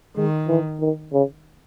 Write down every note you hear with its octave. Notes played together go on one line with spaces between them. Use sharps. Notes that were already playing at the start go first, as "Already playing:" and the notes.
D#3 G#3
E3
D#3
C#3